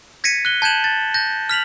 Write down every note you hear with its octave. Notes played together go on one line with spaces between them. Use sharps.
G#6 A#6 B6 C#7 D#7
F#6 G7
A5 G6 G#6 E7 F#7
A6
G6 A#6
F6 B6 F7 F#7